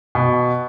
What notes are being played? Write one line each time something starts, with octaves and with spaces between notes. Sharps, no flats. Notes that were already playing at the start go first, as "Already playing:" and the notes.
B2